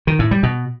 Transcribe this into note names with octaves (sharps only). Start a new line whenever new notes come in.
D#3
A2
G3
B2